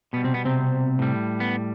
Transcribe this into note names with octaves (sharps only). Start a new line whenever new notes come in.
B2 G3 B3
C3 C4
B3
C3 C4
A2 G3
B3